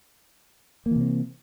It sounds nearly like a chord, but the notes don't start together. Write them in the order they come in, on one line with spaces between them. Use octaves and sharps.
A#3 E3 C3 C4